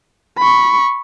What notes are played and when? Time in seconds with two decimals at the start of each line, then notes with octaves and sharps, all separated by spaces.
0.38 B5 C#6